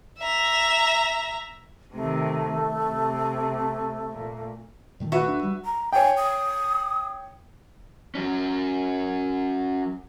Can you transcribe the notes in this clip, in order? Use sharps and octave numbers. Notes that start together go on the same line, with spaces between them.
E5 A#5
C3 D#3 A3
C3
A#2
A#2 D#3 A3
F#4 B4 E5
D2 D4
G3
A#5
C#5 G5 G#5
D#6
F#3 C#4